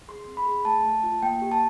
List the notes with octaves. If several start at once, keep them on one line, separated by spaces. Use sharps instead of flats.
G#4 C6
C4
B5
G#4
A3 A5
A3
F4
A#3 G5
G4
A5